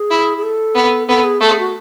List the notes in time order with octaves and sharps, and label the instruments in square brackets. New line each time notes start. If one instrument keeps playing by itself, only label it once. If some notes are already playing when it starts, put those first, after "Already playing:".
Already playing: [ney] G#4
[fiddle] E4
[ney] G#4
A4
[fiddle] B3
[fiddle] B3 [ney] A4
[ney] G#4
[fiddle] A3 [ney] A4
[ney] G#4
F#4